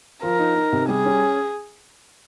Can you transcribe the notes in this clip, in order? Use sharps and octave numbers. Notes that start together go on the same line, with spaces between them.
F3 A#4
D#4
D#4
C3
G3 G#4
C#4